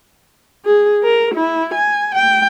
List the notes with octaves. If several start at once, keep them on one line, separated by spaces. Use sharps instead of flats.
G#4
A#4
E4
G#5
G5